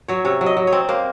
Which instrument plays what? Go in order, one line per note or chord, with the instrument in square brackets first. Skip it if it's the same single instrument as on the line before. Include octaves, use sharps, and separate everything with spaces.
[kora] F#3 C#5
C3 C#5
F#3
D#5
F#3
C#5
C4
A#3 C5